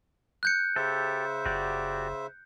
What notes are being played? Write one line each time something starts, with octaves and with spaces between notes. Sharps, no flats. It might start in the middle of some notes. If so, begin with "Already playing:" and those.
F#6 G6 C#7
C#3 G4 A4 C5 E5
F#1 F#4 G4 D5